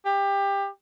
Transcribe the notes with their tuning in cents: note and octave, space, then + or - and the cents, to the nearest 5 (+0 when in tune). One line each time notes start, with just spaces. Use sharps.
G4 +20